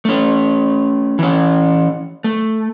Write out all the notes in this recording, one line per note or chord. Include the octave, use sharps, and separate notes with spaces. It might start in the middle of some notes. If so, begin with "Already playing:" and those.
A3 C#4
E3 C#4
A3